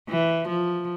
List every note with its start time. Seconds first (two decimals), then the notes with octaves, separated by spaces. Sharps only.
0.09 E3
0.48 F3